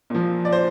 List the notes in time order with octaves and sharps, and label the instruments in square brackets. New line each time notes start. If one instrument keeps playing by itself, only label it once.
[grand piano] A#2 F3
D5
C5